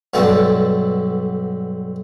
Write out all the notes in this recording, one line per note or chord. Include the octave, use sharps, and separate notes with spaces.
B1 G2 D3 A3 A5